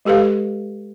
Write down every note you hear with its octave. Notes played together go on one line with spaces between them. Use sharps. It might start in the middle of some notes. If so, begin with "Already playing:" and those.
G#3 G4 A4 B4 F5